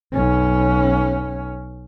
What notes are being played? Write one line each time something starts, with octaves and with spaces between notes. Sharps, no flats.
B1 C#4